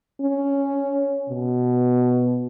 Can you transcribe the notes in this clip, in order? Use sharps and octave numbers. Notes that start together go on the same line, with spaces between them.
C#4
B2